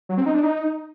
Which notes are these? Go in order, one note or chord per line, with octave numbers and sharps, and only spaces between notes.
F#3
C4
D#4
D4
D#4